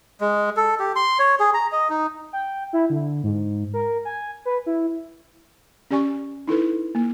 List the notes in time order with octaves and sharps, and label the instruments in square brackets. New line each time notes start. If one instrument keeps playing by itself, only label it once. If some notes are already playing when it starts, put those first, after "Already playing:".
[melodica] G#3
A4
G4
C6
C#5
G#4
A#5
D#5
D#4
[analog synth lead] G5
E4
D3
G#2
A#4
G#5
B4
E4
[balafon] C#4 G4 D5 G#5 C#6
D#4 E4 A4 B4
A#3